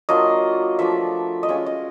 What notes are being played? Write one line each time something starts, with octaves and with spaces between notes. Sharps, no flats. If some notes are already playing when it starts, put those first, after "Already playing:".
F#3 A#3 D4 F4 D#5
F3 A3 D4 E5
D#5
G#3 C#4 F4 E5
D#5